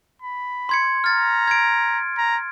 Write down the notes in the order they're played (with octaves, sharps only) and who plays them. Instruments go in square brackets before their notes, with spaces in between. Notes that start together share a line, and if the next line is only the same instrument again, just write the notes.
[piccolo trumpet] B5
[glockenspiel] C6 G#6 C#7
[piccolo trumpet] A#5 [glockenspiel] F6 A6
[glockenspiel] G#6 D7
[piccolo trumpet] A#5